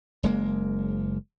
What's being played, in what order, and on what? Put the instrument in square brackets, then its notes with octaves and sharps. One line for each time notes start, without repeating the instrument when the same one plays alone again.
[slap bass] F#1 G#3 A#3